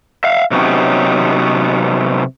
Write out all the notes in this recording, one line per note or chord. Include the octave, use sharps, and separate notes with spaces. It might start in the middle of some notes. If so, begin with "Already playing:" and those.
E5 F5
C3 F#3 B3 C#4 D#4 G4